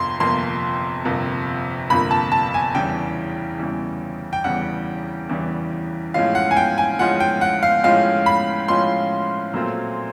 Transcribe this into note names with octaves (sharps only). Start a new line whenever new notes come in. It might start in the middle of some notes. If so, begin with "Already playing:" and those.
Already playing: G1 F2 C3 F3 A#3 C6
G1 F2 C3 F3 A#3 C6
G1 F2 C3 F3 A#3
G1 F2 C3 F3 A#3 B5
A5
A5
G#5
E2 C#3 E3 G3 G5
E2 C#3 E3 G3
G5
E2 C#3 E3 G3 F#5
E2 C#3 E3 G3
A2 F3 G#3 C#4 F4 F5
F#5
G#5
G5
G#5
A2 F3 G#3 C#4 F4 F#5
G5
F#5
F5
A2 F3 G#3 C#4 F4 F5
B5
A2 F3 G#3 C#4 F4 C6
A#2 F#3 A3 C4 F4